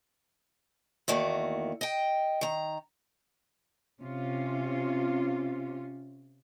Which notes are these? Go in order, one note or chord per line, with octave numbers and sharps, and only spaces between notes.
E2 D#3 A3 A#3 F#4
D#5 G5
D#3 A#5
C3 C#4 F4